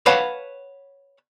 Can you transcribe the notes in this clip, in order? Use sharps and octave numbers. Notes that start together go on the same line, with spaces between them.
B4 C#5 F5 F#5 A5 B5